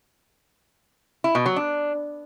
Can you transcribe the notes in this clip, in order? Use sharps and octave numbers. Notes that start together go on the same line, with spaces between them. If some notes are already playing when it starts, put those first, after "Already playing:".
E4
B2
F#3
D4